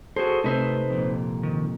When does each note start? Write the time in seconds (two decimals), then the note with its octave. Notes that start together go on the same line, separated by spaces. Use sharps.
0.16 F#4 G#4 A4 C5
0.44 C3 A3 C4 D#4 B4 C5 E5
0.90 F2 A#2
1.43 D#3